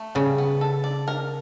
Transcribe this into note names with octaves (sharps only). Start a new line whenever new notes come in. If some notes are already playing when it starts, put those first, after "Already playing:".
Already playing: A3
C#3 G3
B3
A4
D5
A#4